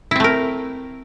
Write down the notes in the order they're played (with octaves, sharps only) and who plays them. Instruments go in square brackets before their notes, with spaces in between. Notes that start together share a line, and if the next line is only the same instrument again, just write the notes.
[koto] E4
C4
A3
A#4